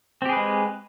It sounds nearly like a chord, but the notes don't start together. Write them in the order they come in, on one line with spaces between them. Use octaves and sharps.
C4 G4 G#4 B4 G#3